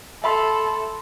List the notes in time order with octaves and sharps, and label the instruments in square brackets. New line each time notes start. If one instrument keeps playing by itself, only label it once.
[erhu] A4 [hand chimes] E5 B5 C6